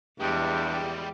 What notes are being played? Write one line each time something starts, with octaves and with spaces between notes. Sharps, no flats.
E2 G2 G3 G#3 G4